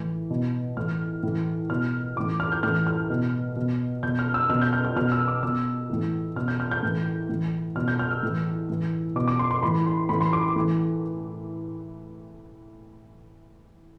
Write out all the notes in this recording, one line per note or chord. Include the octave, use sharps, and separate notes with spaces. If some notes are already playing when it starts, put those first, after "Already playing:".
Already playing: A2 E3
B2
A2 E3 F6
A2 E3
B2 F6
A2 E3 D6
F6
G6
A2 E3 F6
F6
B2
B2
B2 G6
F6
E6
B2 F6
G6
F6
F6
B2 F6
E6
D6
B2 E6
A2 E3
B2 F6
G6
F6
G6
A2 E3
A2 E3
B2 F6
G6
F6
E6
A2 E3
A2 E3
B2 D6
D6
C6
C6
A2 E3 B5
C6
A2 E3 B5
C6
D6
A2 E3